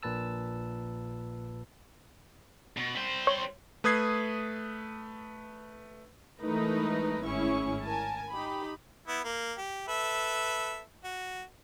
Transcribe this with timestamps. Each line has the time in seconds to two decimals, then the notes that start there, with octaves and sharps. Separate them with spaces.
0.03 A#1 A#2 B4 A5 E6
2.77 B2
2.95 G3 C5
3.27 C#5
3.84 A3 B4 D#6 G#6 C7
6.40 E3 G#3 A3 D#4 A#4 B4
7.22 G#1 A2 C#4 E4 G#4 C#6
7.83 A#4 G#5 A5
8.30 D#4 G4 B5
9.08 B3 E4
9.24 A#3
9.58 G4
9.88 A4 B4 E5
11.04 F#4